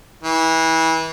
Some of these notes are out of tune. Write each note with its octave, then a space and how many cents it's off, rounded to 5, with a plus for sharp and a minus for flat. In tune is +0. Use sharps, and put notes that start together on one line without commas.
E3 -25